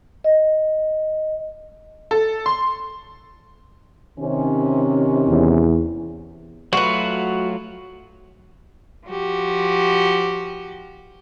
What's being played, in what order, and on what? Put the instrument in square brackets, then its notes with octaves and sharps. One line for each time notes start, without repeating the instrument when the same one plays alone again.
[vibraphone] D#5
[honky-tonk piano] A4
C6
[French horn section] C3 D#3 C#4
[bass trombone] E2
[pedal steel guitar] F#3 A3 F4 [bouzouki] F#4 B4
[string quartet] F3 F#4 G4